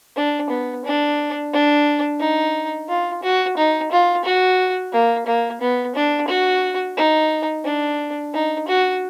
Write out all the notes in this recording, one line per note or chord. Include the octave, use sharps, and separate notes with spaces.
D4
B3
D4
D4
D#4
F4
F#4
D#4
F4
F#4
A#3
A#3
B3
D4
F#4
D#4
D4
D#4
F#4